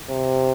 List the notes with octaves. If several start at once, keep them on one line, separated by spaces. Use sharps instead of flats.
C3